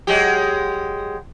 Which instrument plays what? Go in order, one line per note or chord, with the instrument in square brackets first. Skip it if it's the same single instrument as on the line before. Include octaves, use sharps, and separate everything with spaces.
[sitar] F#3 G#3 G4